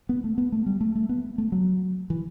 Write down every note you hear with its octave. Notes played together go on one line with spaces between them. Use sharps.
B3
A3
B3
A3
G3
A3
A3
B3
A3
F#3
E3